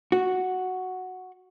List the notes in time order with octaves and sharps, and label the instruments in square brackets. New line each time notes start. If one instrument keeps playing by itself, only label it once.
[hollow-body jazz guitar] F#4